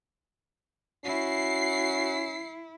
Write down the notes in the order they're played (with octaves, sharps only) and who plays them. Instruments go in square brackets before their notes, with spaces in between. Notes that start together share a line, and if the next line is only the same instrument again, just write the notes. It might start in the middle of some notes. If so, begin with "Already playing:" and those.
[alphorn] C#4 [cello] E4 [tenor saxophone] F#4 [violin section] C7